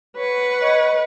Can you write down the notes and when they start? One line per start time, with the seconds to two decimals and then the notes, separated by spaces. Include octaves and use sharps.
0.17 B4 C#5 F#5
0.61 C#5 D#5